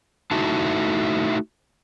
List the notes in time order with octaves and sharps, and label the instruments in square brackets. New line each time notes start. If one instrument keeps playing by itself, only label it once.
[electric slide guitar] A3 D#4 E4 F#4 A5